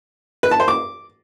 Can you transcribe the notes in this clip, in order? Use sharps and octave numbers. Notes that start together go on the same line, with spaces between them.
B4
A5
C5
D6